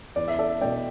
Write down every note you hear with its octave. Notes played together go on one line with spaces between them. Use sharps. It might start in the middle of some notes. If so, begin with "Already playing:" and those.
E2 D5
E5
A4 D5
B2 A3 D5 G5